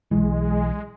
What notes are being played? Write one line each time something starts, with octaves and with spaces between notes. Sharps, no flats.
B1 E3 G#3